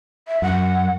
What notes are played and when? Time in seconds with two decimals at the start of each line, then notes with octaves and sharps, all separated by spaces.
0.28 E5
0.42 F#2 F#5